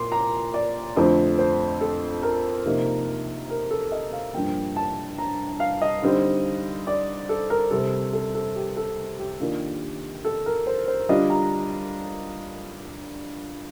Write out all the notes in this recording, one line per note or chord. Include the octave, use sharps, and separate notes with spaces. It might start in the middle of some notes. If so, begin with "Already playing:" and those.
Already playing: A#2 A#3 C6 D6
A#5
D5
F2 D3 F3 A3 C4
C5
A4
A#4
C3 F3 A#3 D#4
A#4
A4
D#5
F5
G2 F3 A#3 G5
A5
A#5
F5
D#5
D3 G3 C4 D#4
D5
A4
A#4
C3 G3 C4 A4
A4
A4
G4
A4
G4
D#3 A#3 D4 F4
A4
A#4
C5
C5
D3 G3 D4 F4 D#5
A#5